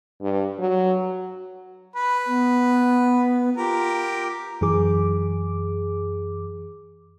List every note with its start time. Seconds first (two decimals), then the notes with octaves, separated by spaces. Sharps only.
0.21 G2
0.59 F#3
1.96 B4
2.27 B3
3.57 F4 G4 A#4
4.61 F#2 E3 G#4 D6